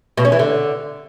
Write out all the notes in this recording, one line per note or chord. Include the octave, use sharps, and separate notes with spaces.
B2
C#4
E3
D3